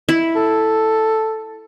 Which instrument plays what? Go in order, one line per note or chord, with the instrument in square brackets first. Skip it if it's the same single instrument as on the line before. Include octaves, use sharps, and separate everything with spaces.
[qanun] E4
[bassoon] A4